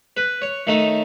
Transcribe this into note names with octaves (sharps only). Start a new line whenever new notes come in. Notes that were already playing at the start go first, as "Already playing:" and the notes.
B4
C#5
D#3 A3 D#4